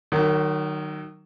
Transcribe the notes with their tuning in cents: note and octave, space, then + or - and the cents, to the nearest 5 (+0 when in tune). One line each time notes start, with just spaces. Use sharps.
D#3 -20 F#3 +25